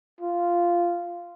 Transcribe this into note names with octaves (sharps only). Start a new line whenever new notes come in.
F4